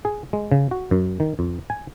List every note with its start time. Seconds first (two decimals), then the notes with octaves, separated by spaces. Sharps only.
0.05 G#4
0.33 G#3
0.52 C#3
0.71 F#4
0.91 F#2
1.20 D#3
1.39 F2
1.70 G#5